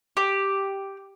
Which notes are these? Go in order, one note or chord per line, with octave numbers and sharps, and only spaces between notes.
G4